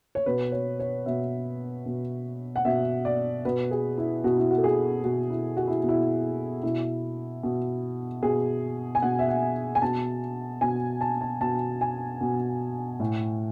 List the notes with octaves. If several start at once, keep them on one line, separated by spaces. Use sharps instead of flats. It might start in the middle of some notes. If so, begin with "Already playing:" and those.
C#5
B2 B4
C#5
C#5
B2 E5
B2
F#5
B2 E5
D5
B2 B4
G#4
E4
B2 F#4
E4
F#4
A4
G#4
B2 F#4
E4
F#4
E4
B2
E4
B2 E4
B2
B2 G#4
G#5
B2 F#5
E5
F#5
G#5
B2 A5
B2 G#5
A5
A5
B2 A5
G#5
B2
A2